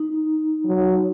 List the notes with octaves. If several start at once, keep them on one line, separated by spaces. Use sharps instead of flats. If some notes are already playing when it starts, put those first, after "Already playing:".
Already playing: D#4
F#3